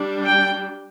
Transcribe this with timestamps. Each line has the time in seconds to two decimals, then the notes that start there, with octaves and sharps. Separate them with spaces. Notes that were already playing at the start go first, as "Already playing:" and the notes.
Already playing: G3 D4
0.25 G5